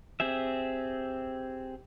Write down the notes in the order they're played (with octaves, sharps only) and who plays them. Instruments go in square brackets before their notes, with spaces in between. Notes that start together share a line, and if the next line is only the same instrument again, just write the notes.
[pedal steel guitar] C4 G4 G#4 E5